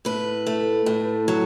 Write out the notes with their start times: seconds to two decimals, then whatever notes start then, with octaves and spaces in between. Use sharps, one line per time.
0.05 A2 B4
0.47 A3
0.86 A2
1.28 F#3